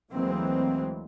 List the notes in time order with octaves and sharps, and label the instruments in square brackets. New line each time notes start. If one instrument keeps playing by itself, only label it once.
[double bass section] D2 E3 F#3 G#3 A#3 C4